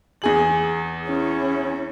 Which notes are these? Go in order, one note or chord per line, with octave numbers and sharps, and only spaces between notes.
E2 G#4 F#7
C#4 E4